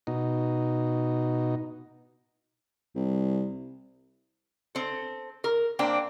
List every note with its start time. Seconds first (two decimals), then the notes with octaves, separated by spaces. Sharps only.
0.07 B2 D#4
2.95 C2
4.75 C4 A4
5.44 A#4
5.79 A#3 C4 D4 G5